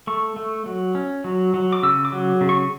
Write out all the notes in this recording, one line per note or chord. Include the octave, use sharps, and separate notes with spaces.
A3 C#6
A3
F#3
C#4
F#3
F#3
D6
C#3 E6
D6
F#3
C#3
C#6